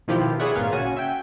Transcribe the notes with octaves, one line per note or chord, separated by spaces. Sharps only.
B2 D#3 F3 E4 F4 G4
G#4 B4 C#5 D5 E5 F#5
G#1 A#2 F4 G#6
C#3 C#4 F#4 G#5
E5 G5